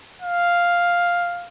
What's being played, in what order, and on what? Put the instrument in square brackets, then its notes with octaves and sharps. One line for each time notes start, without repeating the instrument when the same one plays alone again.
[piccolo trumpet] F5